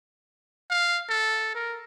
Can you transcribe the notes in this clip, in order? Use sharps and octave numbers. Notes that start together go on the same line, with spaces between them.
F5
A4
A#4